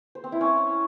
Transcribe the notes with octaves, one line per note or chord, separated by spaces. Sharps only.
C5
C4
E4
C#4